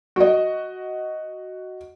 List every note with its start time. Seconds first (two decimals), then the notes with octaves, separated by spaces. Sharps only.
0.16 F#4 D#5